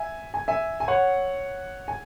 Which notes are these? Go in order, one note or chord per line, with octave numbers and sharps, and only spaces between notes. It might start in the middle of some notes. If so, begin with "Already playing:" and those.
Already playing: E5 G#5
G#5
E5 G#5
G#5
C#5 F#5
G#5